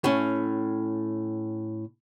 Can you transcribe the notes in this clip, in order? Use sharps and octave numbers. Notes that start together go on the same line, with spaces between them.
A2 C#4